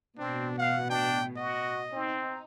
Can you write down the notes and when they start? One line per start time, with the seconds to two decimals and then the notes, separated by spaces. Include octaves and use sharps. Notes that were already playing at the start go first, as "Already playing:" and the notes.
0.19 A1 B2 C4 D4
0.58 F5 F#5
0.90 D4 G5
1.37 F#4 D#5
1.92 C4 D#4